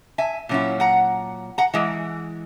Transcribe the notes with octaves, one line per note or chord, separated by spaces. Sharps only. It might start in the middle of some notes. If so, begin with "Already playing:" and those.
E5 G#5
A#2 F#3 C#4 E4
F#5 A#5
F#5 A#5
E3 G#3